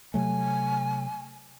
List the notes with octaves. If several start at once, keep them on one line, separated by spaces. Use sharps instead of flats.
C3 F#3 A3 G#5